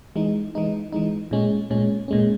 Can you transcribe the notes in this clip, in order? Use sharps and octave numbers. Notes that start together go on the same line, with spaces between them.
E3 G#3 D#4
E3 G#3 D#4
E3 G#3 D#4
A#2 G#3 C#4
A#2 G#3 C#4
A#2 G#3 C#4